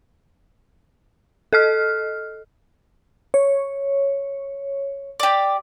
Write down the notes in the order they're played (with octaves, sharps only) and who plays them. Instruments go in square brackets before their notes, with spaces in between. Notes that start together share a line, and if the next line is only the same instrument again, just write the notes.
[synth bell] A4 D#5 F6
[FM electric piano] C#5
[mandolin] G4 D5